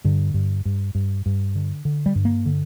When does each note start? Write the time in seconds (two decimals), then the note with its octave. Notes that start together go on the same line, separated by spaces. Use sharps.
0.04 G2 D3
0.34 G2
0.65 G2
0.95 G2
1.26 G2
1.55 D3
1.85 D3
2.06 G3
2.15 G2
2.25 A#3
2.46 D3